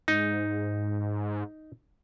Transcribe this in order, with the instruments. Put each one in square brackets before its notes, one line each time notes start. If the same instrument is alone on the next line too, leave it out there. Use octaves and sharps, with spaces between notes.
[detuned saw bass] G#2 [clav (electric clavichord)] D#4